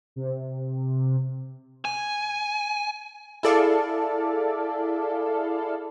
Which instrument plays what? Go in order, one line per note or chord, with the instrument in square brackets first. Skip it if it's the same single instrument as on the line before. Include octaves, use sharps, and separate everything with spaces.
[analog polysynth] C3
[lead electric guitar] G#5
[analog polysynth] E4 G#4 A4 D5 F5